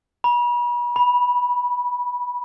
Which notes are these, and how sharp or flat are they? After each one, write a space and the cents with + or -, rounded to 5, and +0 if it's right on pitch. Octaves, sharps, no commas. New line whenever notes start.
B5 -40
B5 -15